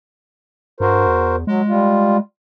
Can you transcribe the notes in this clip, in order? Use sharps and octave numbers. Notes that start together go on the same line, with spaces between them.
G2 F#4 A#4 C5
E2
F#3 G#3
G3 F4